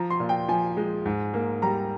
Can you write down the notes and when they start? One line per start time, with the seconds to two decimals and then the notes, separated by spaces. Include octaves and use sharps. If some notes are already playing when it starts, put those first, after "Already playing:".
Already playing: F3 A#5
0.10 C6
0.20 A#2
0.29 G5
0.48 F3 G#5
0.77 G#3
1.06 G#2
1.34 A#3
1.62 G3 A#5